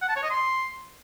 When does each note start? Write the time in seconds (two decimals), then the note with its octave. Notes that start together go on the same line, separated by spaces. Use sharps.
0.02 F#5
0.09 A5
0.16 C#5
0.23 D#5
0.30 C6